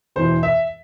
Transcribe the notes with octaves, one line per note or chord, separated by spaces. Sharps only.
E1 E2 E3 C5
E5